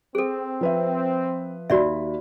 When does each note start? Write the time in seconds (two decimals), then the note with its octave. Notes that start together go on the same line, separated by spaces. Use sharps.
0.15 C4 G#4 A4
0.61 F3 B4 E5
1.70 D#2 F#4 D5 E5 B5